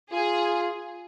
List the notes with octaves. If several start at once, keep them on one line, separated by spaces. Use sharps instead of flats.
F4 G#4